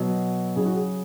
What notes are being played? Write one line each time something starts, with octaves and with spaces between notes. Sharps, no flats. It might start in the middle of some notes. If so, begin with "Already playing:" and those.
Already playing: B2 F#3
C#3 F#3 G#4
F#4
G#4